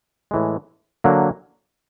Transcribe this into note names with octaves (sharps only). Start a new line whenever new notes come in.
A2 E3 G#3
D3 F#3 A#3